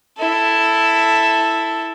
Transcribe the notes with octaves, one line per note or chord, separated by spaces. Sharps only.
E4 A4